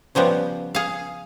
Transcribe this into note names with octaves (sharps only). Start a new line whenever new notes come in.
C#3 F3 G3 B3
G#4 F5